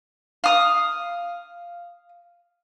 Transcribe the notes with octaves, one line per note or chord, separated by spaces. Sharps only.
F5 D#6